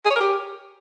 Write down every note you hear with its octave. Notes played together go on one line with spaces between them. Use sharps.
G#4
C#5
A#4
G4